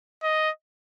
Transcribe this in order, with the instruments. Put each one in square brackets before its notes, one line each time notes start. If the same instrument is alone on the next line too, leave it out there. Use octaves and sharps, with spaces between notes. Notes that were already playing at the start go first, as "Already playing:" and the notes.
[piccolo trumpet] D#5